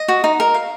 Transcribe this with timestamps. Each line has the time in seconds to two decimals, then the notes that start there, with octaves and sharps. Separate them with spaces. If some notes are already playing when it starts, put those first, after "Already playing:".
Already playing: D#5
0.08 F#4
0.24 D#4
0.40 A#4
0.54 F5